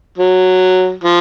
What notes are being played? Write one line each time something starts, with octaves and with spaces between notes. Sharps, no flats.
F#3
F3